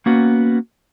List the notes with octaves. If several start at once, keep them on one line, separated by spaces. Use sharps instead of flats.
A#3 B3 C#4 F#4